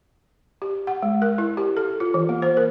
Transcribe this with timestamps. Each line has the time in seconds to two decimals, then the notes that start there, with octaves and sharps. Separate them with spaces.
0.62 G4
0.87 F#5
1.02 G#3
1.22 A#4
1.38 E4
1.57 G4
1.77 A4
2.00 F4
2.14 E3
2.29 A#3
2.42 C5
2.57 A#4